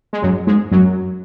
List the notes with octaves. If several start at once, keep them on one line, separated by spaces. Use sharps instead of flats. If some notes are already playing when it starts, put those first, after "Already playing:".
G#3
F#2 F#3
G#2 G#3
F#2 F#3